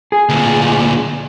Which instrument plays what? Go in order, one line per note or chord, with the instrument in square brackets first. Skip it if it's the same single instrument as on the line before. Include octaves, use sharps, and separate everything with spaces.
[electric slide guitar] G#4
[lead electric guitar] D2 A#2